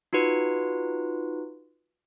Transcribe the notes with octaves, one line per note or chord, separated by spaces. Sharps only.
D#4 F4 F#4 B4